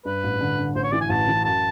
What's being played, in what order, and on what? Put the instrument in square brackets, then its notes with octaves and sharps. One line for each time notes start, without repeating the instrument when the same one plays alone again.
[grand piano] G2 [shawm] B4
[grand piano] A1
D3
D3
[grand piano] A1 [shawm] C5
[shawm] C#5
[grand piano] E3 [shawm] D5
[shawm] G#5
[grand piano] A1 [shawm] A5
[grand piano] E3
[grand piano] F#2 [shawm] A5